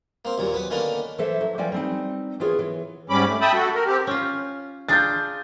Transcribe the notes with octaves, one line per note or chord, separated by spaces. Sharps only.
A#3 C4
D#2 A#2 F#3
B3 B4
D3 D#3 A#3 B3 C#4 D4
E3 A4 C5 E5
F#3
E3 F3 D5 G5 G#5
G3 C4 D#4
E3 B3 F4 G#4 C#5
E3
G#2 G3 C#4 B5 D6
A3
E5 G5 A5 B5 D#6
F#4 A4
A#4
C4 G4
C#4 F4
D4 F4 G#4 G6 A6